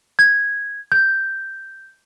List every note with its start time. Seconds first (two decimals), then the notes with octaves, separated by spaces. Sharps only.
0.19 G#6
0.92 G6